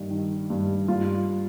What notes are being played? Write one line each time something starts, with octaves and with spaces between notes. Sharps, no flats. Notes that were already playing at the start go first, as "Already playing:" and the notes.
Already playing: G2 D#3
D#3
G2
G2 F4